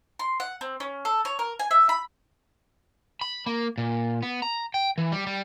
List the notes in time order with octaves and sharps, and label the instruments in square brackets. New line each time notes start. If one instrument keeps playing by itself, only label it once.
[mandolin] C6
F#5
C4
C#4
A4
C#5
A#4
G#5
E5
B5
[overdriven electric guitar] B5
A#3
A#2
B3
A#5
G5
E3
G3
G3